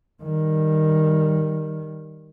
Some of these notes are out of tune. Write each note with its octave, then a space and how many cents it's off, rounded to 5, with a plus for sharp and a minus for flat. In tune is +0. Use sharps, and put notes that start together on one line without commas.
D#3 +0 G3 +0